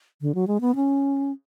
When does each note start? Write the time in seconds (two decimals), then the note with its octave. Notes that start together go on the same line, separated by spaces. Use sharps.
0.21 D3
0.35 F#3
0.47 G#3
0.61 B3
0.75 C#4